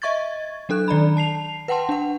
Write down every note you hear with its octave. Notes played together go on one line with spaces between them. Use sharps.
D#5 E5 C#6 G#6 A6
F#3 D4 A4 F#6
D#3 D5 A#5 B5
A5 C7 F7
B4 F#5 G5 A5 C6
D4 F#5